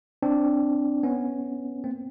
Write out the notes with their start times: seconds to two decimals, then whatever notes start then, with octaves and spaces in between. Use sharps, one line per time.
0.22 C4 D4
1.03 B3 C#4
1.84 A#3 C4